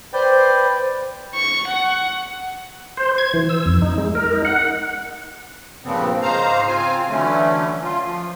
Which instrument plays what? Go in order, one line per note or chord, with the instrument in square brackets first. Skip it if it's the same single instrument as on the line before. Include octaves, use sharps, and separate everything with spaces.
[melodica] B4 D5 G5 [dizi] C5
[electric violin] C#6
F#5
[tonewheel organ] C5
G#6
E3
E6
F2
D#4
G#3
A#4
D#4
F#5
[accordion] G2 A#2 C#3 F3 B3 C4
G#2 C#3 C5 F5 A#5
C4 F4 G#5
D3 E3 F#3 A3 C#4
F4
F3